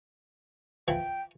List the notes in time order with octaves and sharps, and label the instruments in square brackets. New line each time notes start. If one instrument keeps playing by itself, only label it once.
[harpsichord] E3 F3 [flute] G5